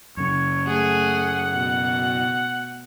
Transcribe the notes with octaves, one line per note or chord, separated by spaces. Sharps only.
F#2 C#3 C#5
A3 G#4 F#5
B2